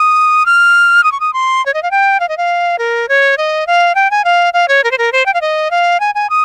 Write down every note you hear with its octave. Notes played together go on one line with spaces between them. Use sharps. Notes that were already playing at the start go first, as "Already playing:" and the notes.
Already playing: D#6
F6
D#6
C#6
D#6
C6
C#5
D#5
F5
G5
F5
D#5
F5
A#4
C#5
D#5
F5
G5
G#5
F5
F5
C#5
A#4
C5
A#4
C5
G5
F5
D#5
F5
G#5
G#5
D#6